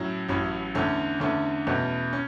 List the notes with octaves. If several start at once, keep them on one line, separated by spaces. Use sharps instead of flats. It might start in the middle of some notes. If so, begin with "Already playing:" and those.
Already playing: A2 F#3 C#4
A1 A2 F#3 C#4
E2 D3 A3 C#4
E2 D3 A3 C#4
E2 B2 A3 C#4
C#4